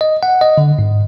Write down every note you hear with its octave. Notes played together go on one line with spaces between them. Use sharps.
D#5
F#5
D#5
D3
G#2